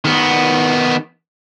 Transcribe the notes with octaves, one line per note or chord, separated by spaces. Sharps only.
D#3 B3